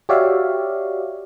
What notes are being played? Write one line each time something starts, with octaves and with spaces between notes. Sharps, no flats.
F#4 G4 C#5 D5 E5 F5